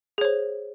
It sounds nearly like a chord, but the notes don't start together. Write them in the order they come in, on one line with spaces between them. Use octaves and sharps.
G#4 C#5 C5